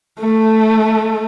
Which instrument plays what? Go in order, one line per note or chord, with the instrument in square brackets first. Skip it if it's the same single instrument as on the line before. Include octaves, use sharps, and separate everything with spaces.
[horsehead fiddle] A3